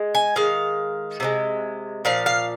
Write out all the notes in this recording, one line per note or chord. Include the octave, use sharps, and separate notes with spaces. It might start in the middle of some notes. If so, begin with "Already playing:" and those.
Already playing: G#3
G#5
D#3 G#3 F5
C3 F3 G#3
A#2 F3 F5
F5